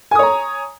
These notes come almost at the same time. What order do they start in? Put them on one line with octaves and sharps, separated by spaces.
G#5 D#6 C#5 A#5